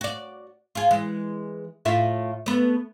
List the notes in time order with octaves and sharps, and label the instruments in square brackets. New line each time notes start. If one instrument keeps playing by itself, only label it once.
[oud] F#4 D5
F4 G#4
E3 G#3
A2 F4 E5
A3 B3